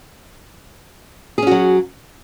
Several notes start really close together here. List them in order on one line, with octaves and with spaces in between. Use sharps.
G#4 C#4 F#4 F#3